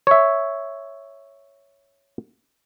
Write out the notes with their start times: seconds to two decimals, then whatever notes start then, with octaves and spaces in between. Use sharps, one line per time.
0.07 C#5 E5